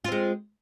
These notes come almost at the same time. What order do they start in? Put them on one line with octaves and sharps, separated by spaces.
F4 C4 G#3